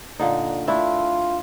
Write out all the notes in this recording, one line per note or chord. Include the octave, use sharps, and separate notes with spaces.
A#2 D3 D#4
A3 D4 E4 F4